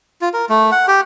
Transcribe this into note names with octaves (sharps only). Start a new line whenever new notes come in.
F4
A#4
A3
F#5
G4